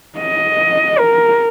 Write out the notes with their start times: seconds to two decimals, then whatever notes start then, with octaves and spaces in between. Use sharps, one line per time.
0.18 D#5
0.99 A#4